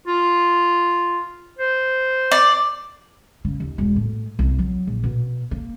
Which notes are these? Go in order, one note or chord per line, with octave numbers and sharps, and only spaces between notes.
F4
C5
D5
C#3
D#2
E1
A2
C2
F#3
A#1
B2
A#3